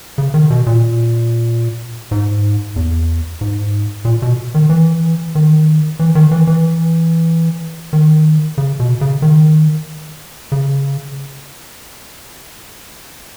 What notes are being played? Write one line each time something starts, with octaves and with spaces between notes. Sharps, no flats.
C#3
D#3
B2
A#2
G#2
E2
G#2
A#2
B2
D#3
E3
D#3
E3
D#3
E3
E3
D#3
C#3
B2
C#3
D#3
C#3